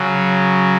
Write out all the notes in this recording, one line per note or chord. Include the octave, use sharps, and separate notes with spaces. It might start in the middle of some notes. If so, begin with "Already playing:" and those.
Already playing: C#3 F#3